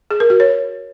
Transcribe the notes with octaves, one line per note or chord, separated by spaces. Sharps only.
G#4
A#4
F#4
C#5